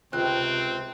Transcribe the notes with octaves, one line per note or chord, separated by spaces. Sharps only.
C#2 C3 C4 F#6